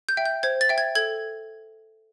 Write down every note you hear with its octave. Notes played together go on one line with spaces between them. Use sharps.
G6
E5 G5
G6
C5 G#6
A6
E5 G5
G#6
A4 G#6